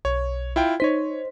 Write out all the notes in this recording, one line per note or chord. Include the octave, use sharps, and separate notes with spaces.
B1 C#5
E4 F4 G5
D#4 C5 C#5 B6